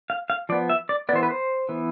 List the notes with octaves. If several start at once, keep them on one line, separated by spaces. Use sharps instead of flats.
F5
F5
F3 B3 D5
E5
D5
E3 B3 C5 D5
B4
C5
E3 B3